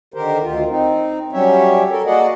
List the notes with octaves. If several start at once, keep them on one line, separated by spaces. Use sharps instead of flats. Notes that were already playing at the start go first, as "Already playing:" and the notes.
D3 D#3 G4 A#4 C5
D2 D#3 F4
C4 D#4
F#3 G3 C#4 G4 C#5 E5
A4 A#4
A#3 F#4 G#4 D5 D#5 F#5